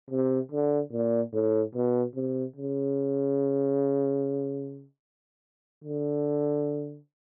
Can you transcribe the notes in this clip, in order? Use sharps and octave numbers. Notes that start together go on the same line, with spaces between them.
C3
D3
A#2
A2
B2
C3
C#3
D3